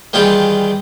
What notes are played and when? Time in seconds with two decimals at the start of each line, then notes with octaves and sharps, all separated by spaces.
0.13 D#3 E3 G3 F4 G4 G#4